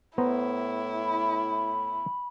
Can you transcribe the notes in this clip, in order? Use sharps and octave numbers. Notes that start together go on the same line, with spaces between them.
A2 B3 E4 C5 A#5
B5